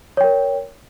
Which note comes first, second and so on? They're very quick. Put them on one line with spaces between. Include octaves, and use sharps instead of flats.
C#5 G5 A#4